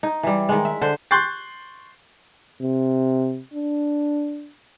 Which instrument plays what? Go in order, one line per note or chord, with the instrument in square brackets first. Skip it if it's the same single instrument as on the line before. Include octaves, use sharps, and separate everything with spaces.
[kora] D#4
E3 G3
D#3 G#3
E5
D3 C5
[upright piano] C6 C#6 F#6 G6 A6 C7
[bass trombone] C3
D4